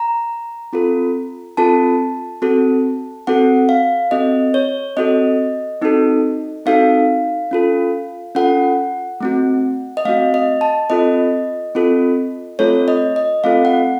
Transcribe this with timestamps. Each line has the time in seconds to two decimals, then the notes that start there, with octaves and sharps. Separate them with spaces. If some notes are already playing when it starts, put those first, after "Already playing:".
Already playing: A#5
0.73 C4 F4 A4
1.57 C4 F4 A4 A5
2.42 C4 F#4 A4
3.27 C4 F#4 A4 F#5
3.69 F5
4.11 C4 F#4 A4 D#5
4.54 C#5
4.97 C4 F#4 A4 D#5
5.82 C4 D#4 F#4 A4
6.66 C4 D#4 F#4 A4 F5
7.51 C#4 F4 A4
8.35 C#4 F4 A4 F#5
9.20 A3 C4 F#4
9.97 D#5
10.05 A3 C4 F#4 F5
10.34 D#5
10.61 A5
10.90 C4 F4 A4 D#5
11.75 C4 F4 A4
12.59 A3 C4 F4 A4 C#5
12.88 D#5
13.16 D#5
13.44 A3 C4 F4 A4 F5
13.65 F#5